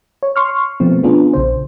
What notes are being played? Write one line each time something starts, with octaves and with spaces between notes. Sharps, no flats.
C#5
C6 C#6 F6
B2 F3 A3 B3 C4
B3 C#4 D4 F4 G#4
A#1 C#3 C5